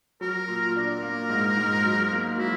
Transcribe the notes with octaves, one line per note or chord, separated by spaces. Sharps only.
F#3 A#4
A#2
D4 A#4
A#3
G#2
G#2
F#3
A#3
F#3 E4